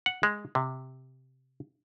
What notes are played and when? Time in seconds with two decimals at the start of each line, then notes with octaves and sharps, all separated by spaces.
0.06 F#5
0.23 G#3
0.55 C3